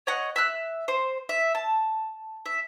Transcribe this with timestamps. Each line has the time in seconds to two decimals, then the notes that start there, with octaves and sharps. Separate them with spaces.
0.07 C#5 D#5 F#5
0.36 E5 E6 F#6
0.88 C5
1.29 E5
1.55 A5
2.46 E5